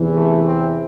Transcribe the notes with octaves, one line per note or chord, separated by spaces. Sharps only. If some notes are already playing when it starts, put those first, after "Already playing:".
Already playing: E2 C3 E3
A3
C4